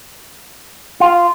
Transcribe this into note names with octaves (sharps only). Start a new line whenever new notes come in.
F4